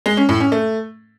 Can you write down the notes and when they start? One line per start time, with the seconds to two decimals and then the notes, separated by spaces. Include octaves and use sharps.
0.06 G#3
0.17 C#4
0.29 A2
0.40 C#4
0.52 A3